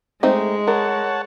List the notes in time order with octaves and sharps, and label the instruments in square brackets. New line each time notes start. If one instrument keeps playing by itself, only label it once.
[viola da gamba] G#3 [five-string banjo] A3 C4 D#4
[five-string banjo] A#4 [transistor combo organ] C#5 F#5 A5